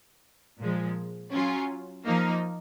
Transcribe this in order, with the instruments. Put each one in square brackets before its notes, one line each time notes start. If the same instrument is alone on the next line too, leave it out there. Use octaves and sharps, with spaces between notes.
[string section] A#2 F3 G#3
F#3 C#4 F4
F3 A#3 D#4